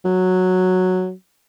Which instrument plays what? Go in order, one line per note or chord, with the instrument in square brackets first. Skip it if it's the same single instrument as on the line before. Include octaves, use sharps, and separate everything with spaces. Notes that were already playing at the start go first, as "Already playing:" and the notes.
[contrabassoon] F#3